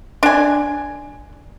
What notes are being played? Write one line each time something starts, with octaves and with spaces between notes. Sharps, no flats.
D4 G#5